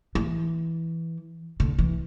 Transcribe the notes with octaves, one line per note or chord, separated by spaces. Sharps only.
E3
D3
E3